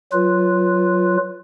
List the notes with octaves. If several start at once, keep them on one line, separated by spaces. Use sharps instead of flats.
F#3 F4 B4